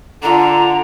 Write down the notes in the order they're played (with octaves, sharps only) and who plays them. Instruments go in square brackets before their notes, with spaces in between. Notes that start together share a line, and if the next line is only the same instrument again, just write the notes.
[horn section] D3 [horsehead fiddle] F4 [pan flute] A#5